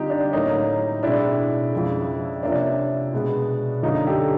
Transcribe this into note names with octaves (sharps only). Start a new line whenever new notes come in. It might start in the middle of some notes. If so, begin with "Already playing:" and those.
Already playing: D3 G3 C4 D#4 F4 G4
D4
A2 F#3 A#3 C#4 D#4
B2 G#3 C4 D4 E4
F2 C#3 F3 G#3
C3 F3 A#3 C#4 D4
B2 G#3 B3
F#2 D3 F3 A#3 D#4
G4 A4